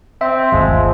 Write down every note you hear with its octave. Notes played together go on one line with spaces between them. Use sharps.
C4 E5
D1 G1 D#2 F3 G#3